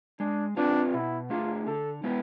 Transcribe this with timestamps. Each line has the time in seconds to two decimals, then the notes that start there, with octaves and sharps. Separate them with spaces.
0.20 G#3 D4
0.57 C4 D4 F4 B4 D5
0.93 B2 E4
1.30 A3 D4 F4 G#4
1.67 D3 A4
2.04 G#3 B3 E4 B4